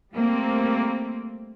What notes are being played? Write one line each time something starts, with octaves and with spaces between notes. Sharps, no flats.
G3 A3 A#3 C4